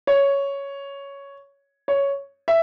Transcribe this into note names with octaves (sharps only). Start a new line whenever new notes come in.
C#5
C#5
E5